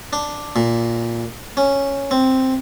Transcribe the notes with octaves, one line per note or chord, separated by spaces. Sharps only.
D4
A#2
C#4
C4